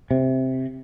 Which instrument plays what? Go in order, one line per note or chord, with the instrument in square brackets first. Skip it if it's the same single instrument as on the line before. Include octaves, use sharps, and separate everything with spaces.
[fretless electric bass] C3